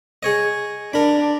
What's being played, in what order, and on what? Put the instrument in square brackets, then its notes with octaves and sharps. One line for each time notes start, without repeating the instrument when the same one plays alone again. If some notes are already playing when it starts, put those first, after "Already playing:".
[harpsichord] G#4 C#5 D#5
[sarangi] D4 [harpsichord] A#4 B5